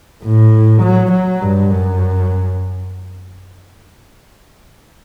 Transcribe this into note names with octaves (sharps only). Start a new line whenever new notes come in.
A2
F#3
F#3
G2
F#2